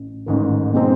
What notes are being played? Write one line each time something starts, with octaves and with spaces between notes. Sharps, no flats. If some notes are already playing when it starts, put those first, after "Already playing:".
Already playing: A1
A1 G#2 D#3
B2 G#3 C4 D#4